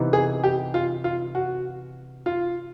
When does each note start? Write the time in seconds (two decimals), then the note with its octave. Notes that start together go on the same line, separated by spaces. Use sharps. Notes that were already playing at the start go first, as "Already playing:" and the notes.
Already playing: C3 E3 B3 D#4
0.13 G#4
0.44 G4
0.74 F4
1.04 F4
1.35 F#4
2.26 F4